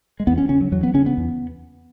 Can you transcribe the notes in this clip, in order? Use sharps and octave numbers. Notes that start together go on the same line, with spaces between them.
G#3
E2 B3
C#4
C#3 C#4
F#3
E2 F#3
B3
C#3 C#4
B3
E2